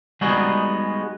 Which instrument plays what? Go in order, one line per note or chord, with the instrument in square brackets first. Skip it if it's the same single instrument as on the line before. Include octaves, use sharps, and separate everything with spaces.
[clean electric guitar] G3 G#3 B3 D#4 F#4 G#4